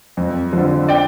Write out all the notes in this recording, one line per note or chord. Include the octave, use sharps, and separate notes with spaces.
F2
D3 F3
D5 G5